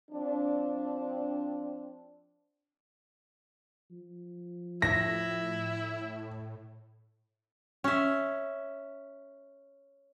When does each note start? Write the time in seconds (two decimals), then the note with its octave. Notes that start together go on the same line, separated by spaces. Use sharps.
0.11 F3 C4 D4
3.92 F3
4.82 A2 E4 A#6
7.84 C#4 E5